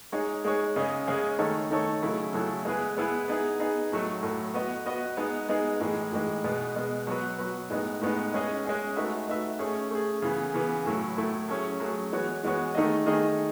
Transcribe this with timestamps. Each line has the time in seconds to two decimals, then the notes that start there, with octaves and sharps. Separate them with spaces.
0.12 G#3 D#4 G#4 C#5
0.45 G#3 D#4 G#4 C#5
0.76 C#3 G#3 C#4 G#4 D#5
1.07 C#3 G#3 C#4 G#4 D#5
1.39 D#3 A3 D#4 A4 C#5
1.71 D#3 A3 D#4 A4 C#5
2.02 C#3 F#3 A3 E4 A4
2.33 C#3 F#3 A3 E4 A4
2.65 G#3 B3 E4 G#4 B4
2.97 G#3 B3 E4 G#4 B4
3.28 B3 D#4 G#4
3.60 B3 D#4 G#4
3.92 A2 F#3 A3
4.23 A2 F#3 A3
4.54 B3 F#4 B4 D#5
4.86 B3 F#4 B4 D#5
5.17 G#3 B3 D#4 G#4
5.49 G#3 B3 D#4 G#4
5.81 A2 E3 G#3 D#4
6.12 A2 E3 G#3 D#4
6.44 B2 G#3 B3
6.75 B2 G#3 B3
7.07 F#3 B3 F#4 B4
7.39 F#3 B3 F#4 B4
7.70 A2 G#3 B3 D#4
8.02 A2 G#3 B3 D#4
8.33 G#3 C#4 G#4 D#5
8.65 G#3 C#4 G#4 D#5
8.96 A3 D#4 F#4 B4 E5
9.28 A3 D#4 F#4 B4 E5
9.59 A3 C#4 G#4
9.91 A3 C#4 G#4
10.22 C#3 E3 B3
10.54 C#3 E3 B3
10.86 A2 F#3 A3 E4
11.17 A2 F#3 A3 E4
11.49 F#3 A3 C#4 G#4
11.80 F#3 A3 C#4 G#4
12.12 E3 G#3 B3 F#4 C#5
12.44 E3 G#3 B3 F#4 C#5
12.75 D#3 A3 D#4 G#4 D#5
13.06 D#3 A3 D#4 G#4 D#5